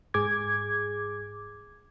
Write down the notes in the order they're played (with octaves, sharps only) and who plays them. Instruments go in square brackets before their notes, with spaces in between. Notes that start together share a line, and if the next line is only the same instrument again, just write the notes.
[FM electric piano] G#2 G#4 D6 G#6